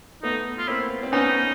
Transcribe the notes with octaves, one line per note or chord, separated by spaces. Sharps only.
A3 B3 D#4
F4
A#3 C4 E4
C4
B3 C#4 D#4